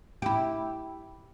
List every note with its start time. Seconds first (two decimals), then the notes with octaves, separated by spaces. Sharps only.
0.22 E4 G4